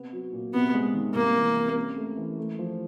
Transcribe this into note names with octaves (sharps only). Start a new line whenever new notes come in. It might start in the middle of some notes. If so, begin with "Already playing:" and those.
Already playing: C3 B3
F#3
A#2
C3 B3
G#3
D#3
C2 A#3
E3
C3
C#4
A3
E3
A3
F3